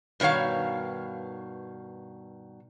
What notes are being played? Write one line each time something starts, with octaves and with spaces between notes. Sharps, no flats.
G2 B2 D#3 C#5 F5